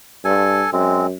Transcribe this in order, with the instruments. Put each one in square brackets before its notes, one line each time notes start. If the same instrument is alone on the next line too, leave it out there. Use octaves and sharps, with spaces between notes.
[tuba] G2 [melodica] A4 G#5
[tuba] F#2 [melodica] G#3 C4